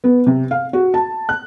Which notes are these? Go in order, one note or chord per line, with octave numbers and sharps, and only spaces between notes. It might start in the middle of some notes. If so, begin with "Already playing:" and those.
B3
C3
F5
F#4
A5
F#6